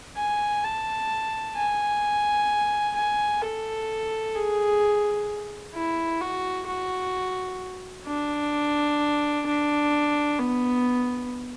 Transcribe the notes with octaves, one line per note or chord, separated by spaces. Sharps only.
G#5
A5
G#5
G#5
A4
G#4
E4
F#4
F#4
D4
D4
B3